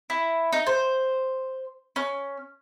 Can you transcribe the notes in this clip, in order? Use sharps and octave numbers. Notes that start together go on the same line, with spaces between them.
E4
D#4
C5
C#4